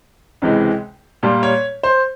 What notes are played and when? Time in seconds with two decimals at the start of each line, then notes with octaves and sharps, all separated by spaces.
0.42 C#2 C3 E3 G#3
1.23 A#2 G3 A#3
1.43 C#5
1.83 C5